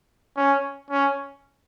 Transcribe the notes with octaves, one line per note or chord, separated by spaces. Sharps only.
C#4
C#4